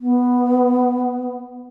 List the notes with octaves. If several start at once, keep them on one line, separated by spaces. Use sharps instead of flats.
B3